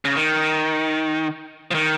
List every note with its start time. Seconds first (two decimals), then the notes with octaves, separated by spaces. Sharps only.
0.05 C#3
0.16 D#3
1.71 F3
1.74 D#3